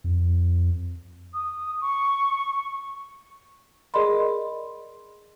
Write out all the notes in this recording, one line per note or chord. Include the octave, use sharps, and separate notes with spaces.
F2
D#6
C#6
G#4 A#4 D5 D#5 B5 C6